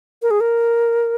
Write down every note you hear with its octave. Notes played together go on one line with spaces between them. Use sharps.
A#4
G#4
A#4